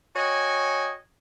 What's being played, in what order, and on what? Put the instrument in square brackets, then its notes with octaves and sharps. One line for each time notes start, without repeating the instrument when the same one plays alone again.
[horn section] F#4 C#5 D#5 G5 G#5